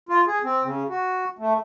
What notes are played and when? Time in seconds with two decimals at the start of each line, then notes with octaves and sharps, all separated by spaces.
0.09 F4
0.27 G#4
0.44 C4
0.64 C#3
0.89 F#4
1.39 A3